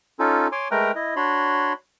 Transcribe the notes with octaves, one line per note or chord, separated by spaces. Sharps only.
C#4 D#4 F4 A4
C#5 G#5 C6 D6
G#3 A3 A#4 B4 G5 A#5
E4 D#5
D4 F#4 C#5 B5 C6